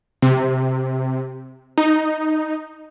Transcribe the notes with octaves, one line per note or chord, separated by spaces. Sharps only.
C3
D#4